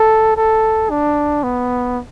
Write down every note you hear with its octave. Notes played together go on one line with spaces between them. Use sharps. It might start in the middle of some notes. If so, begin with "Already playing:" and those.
Already playing: A4
A4
D4
B3